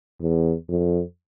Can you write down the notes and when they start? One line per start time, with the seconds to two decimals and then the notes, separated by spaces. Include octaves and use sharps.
0.21 E2
0.69 F2